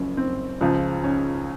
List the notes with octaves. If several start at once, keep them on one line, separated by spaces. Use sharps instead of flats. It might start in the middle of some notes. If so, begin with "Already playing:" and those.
Already playing: F#1 F#2 F3 C#4
C4
C#2 C#3 F3
C#4